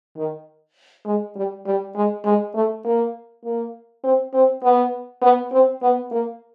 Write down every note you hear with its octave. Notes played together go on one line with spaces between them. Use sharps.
D#3
G#3
G3
G3
G#3
G#3
A3
A#3
A#3
C4
C4
B3
B3
C4
B3
A#3